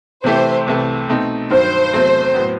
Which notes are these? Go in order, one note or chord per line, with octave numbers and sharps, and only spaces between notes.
C3 E3 A3 E4 G4 C5
C2 C3 E3 A3
B2 A3 C4 D#4
G2 D#3 F#3 C5
E2 C3 F#3 A3 C4
A2 F#3 B3